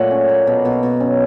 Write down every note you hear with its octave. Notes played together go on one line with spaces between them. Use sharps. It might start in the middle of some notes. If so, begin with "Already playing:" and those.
Already playing: A#2 F#3 A3 F#5
C#4
A#3
B2
B2
B2
C#4